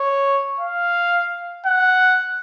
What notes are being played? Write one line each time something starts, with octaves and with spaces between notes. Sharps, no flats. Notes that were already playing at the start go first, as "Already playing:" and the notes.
Already playing: C#5
F5
F#5